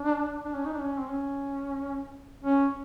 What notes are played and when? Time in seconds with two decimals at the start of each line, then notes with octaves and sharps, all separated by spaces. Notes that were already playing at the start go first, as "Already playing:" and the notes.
Already playing: D4
0.45 D4
0.54 C#4
0.65 D#4
0.73 D4
0.81 C#4
0.99 C4
1.09 C#4
2.43 C#4